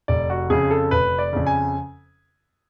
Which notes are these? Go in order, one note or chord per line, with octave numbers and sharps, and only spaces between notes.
F1 D5
F#4
F2 C#3 G#4
A4
F1 B4
D5
F2 C#3
G#5